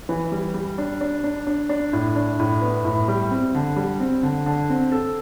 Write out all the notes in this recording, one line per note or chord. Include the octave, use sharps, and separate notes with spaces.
E3
G3
G3
D4
D4
D4
D4
D4
A2
D4
A2
B3
A2
G3
C4
D3
G3
C4
D3
D3
C4
A4